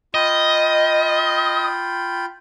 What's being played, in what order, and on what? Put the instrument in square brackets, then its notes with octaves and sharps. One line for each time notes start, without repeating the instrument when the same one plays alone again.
[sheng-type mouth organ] F4 G5 B5 [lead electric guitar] D#5